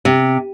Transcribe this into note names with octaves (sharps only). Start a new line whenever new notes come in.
C3